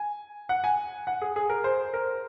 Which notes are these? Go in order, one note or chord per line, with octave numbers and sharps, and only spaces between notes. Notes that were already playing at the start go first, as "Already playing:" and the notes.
Already playing: G#5
F#5
G#5
F#5
G#4
G#4
A#4
C5
A#4